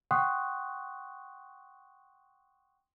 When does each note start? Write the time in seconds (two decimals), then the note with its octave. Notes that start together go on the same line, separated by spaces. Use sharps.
0.11 F#5 G5 C6 C#6 D#6 F#6